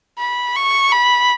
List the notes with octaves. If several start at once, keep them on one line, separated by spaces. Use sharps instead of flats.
B5
C#6
B5